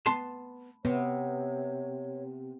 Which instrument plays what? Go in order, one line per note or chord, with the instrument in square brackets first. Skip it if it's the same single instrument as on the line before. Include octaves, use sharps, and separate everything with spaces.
[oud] B3 [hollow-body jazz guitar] A5 C6
[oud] C3 [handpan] B3 [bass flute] C#5